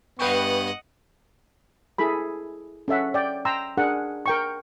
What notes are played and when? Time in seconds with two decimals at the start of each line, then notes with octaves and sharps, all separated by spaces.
0.19 G2 B3 B4 D#5 F#5 G5 C#6
1.98 E4 G#4 A4 B5
2.88 C#4 A4 E5 F#5
3.14 D5 G5
3.45 G5 A#5 C6 E6
3.77 D4 G#4 A#4 F#5
4.26 A#4 G5 C#6